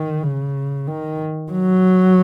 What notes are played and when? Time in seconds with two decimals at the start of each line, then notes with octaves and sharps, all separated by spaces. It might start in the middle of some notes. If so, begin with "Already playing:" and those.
Already playing: D#3
0.23 C#3
0.87 D#3
1.52 F#3